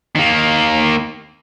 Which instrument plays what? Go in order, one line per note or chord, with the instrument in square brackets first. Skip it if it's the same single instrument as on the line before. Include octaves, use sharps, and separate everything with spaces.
[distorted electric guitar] D#3 A#3